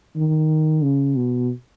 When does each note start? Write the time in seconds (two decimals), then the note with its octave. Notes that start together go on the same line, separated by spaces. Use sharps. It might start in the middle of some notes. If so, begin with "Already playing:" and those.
0.16 D#3
0.82 C#3
1.16 B2